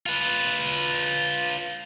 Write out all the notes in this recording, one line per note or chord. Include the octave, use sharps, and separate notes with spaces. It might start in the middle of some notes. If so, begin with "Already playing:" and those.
F4 B4